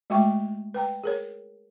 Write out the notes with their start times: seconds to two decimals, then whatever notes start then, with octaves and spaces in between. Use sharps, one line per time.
0.10 G#3 A3 F#4 E5 G5 C#6
0.74 B4 G5 A#5
1.04 G#4 A#4 C#5